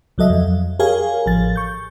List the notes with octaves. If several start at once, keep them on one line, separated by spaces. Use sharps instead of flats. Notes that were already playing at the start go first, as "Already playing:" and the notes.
C#2 F#3 A4 D#5 E5
F2
G4 G#4 A#4 C#5 F5 G#5
A1 F3 A6
C#6 G6